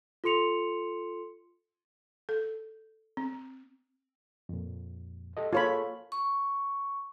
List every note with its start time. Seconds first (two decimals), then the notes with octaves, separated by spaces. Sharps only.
0.24 F4 A4 C6 C#7 F7
2.29 A4
3.17 C4
4.49 F2 A#2
5.37 G4 A4 D#5
5.53 A#3 F4 G#4 A4 C#5 B5
6.12 C#6